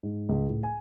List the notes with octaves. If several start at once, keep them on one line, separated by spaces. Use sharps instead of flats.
G#2
C#2
A2
G#5